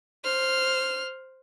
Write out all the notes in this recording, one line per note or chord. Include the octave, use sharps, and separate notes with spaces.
C5 F6